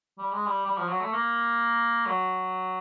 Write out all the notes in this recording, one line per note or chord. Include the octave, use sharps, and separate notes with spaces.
G3
G#3
G3
G3
F3
F#3
A3
A#3
F#3